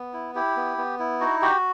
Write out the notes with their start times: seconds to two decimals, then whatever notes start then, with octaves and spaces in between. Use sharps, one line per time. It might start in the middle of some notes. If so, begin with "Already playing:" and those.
Already playing: B3
0.13 E4
0.35 E4 G4
0.56 B3
0.78 B3
0.99 E4
1.21 D#4 F#4
1.42 F#4 G4